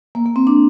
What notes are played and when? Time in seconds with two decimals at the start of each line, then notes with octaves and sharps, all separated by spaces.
0.15 A#3
0.26 A#3
0.36 C4
0.47 D4